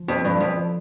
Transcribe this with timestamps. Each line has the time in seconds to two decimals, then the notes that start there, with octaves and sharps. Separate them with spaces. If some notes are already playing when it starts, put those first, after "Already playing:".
Already playing: F3
0.08 F2
0.24 G2 F3
0.40 F2
0.57 F3